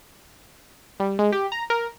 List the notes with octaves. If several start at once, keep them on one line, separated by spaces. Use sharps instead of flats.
G3
G#3
G4
A#5
A#4